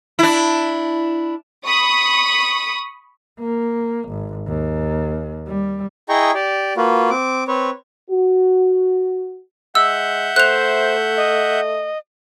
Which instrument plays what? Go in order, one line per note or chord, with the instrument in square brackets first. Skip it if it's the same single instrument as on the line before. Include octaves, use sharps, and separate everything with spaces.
[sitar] D4 E4
[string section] B5 C#6 D#6
[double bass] A#3
G#1
D#2
G3
[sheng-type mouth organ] E4 G#4 D#5 G5 A#5 C#6
G4 D5
A#3 F4 F#4 B4
C4 D6
C4 B4 C#5
[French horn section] F#4
[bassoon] G#3 [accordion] E5 F#5 G6 [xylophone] E6
[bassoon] A3 [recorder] C5 [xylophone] F#6 F7
[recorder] D#5